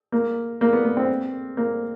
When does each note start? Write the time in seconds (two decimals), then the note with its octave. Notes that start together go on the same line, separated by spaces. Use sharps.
0.12 A#3
0.61 A#3
0.73 B3
0.85 B3
0.97 C4
1.57 A#3